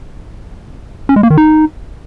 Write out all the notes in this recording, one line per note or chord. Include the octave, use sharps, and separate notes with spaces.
C#4
G#3
A#3
D#3
D#4